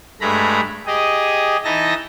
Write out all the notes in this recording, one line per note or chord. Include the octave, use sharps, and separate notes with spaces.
G2 G#3 A3 A#5 B5
G4 G#4 D#5
E3 D#4 D#5 E5 A5 A#6